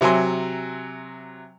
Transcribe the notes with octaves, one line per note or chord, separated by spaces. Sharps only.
C3 F#3 E5 G#5 C6